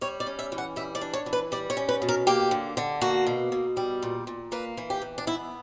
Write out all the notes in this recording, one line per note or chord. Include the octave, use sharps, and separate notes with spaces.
G3 C#5
D5
C#4
E5
E3
F#5
G3 E5
D5
D4
C#5
E3
B4
G3 D5
C#5
C#4
B4
B2
A#4
A#3 G4
D3
D3
A#3 F#4
B2
B2
G3
A#2
A#2
A#3 B4
E3
G4
E3
D4
B3 E4